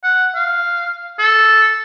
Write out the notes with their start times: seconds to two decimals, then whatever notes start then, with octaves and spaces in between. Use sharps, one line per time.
0.04 F#5
0.35 F5
1.19 A4